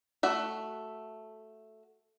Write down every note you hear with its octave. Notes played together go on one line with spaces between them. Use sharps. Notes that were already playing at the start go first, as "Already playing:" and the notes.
A3 F#4 E5